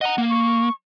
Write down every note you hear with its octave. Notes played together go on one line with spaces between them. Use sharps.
D#5 F#5 A#5
A#3
C#6